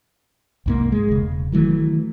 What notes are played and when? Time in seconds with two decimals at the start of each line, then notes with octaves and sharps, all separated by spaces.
0.66 C2 G#2 A#3
0.92 G#3
1.08 E1 C#3
1.52 D#3 E3 F#3 A3